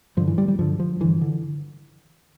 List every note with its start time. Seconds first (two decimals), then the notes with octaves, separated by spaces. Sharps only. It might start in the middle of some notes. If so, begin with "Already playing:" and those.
0.17 G2 D3 F3
0.28 E3
0.38 G3
0.48 G3
0.59 G2 D3 F3
0.80 F3
1.00 G2 D3 E3
1.21 D3